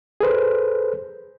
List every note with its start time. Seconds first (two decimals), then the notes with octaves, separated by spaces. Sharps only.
0.20 G#4 A4 B4 C5